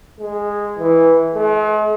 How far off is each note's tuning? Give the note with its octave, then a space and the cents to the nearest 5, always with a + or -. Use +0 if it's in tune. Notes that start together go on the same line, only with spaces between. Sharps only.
G#3 -10
E3 -5
G#3 +45